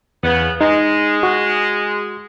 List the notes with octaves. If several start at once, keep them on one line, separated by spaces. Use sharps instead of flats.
E2 C#3 B3
G#3 D#4
F#4